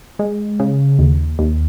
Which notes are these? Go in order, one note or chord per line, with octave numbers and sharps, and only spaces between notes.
G#3
C#3
D#2
D#2